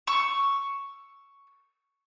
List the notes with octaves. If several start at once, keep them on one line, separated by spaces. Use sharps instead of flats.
C#6 E6